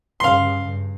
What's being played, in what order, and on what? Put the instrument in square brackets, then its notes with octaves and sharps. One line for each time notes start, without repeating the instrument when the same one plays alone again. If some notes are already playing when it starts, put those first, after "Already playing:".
[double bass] G2 C#3 [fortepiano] F5 C6
[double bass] G2